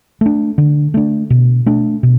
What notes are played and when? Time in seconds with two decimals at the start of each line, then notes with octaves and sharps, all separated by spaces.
0.21 A3 D4
0.58 D3
0.94 A3 D4
1.30 B2
1.66 A3 D4
2.03 B2